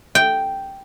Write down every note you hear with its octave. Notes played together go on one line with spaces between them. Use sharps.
G5